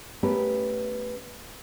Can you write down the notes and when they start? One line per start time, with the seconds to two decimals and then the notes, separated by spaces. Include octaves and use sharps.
0.23 A3 B3 C#4 G4 A#4 B4